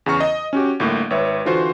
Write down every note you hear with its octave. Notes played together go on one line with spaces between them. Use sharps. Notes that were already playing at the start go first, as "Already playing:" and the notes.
E2 C#3 A#5 C#6 F6
D#5
C#4 F#4 G4
G1 A2 A#3
G#1 B4 C#5 E5
D3 E3 F4 F#4 C5